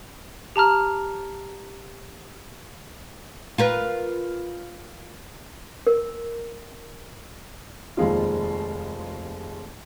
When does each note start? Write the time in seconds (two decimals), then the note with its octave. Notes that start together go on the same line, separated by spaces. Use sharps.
0.56 G4 A5 A#5 F6
3.58 F4 A#4 B4
5.87 A#4
7.97 F1 D#2 F3 G#3 C4 F4